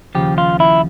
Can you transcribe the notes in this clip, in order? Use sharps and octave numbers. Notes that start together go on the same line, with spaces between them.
D#2 C#3 F3 G4
F4
E4